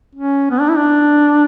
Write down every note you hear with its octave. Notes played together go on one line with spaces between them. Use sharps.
C#4
B3
D4
E4
D4